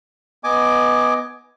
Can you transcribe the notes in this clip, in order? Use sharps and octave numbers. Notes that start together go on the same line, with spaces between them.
B3 D#5 G#5 D6